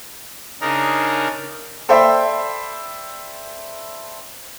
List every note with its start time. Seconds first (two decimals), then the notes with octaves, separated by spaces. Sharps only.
0.61 C#3 D4 D#4 G#4 A#4
1.89 A4 C5 D5 E5 G5 B5